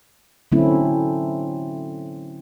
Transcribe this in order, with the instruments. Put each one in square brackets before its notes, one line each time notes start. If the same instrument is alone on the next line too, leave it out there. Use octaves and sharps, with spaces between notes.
[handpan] D3 F#3 A3 C4 C#4 E4